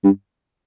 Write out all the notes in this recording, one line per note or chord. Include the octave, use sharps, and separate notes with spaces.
G2